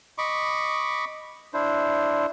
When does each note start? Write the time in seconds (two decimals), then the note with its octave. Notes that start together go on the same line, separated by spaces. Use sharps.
0.18 D#5 B5 C#6 D6
1.54 D4 E4 C5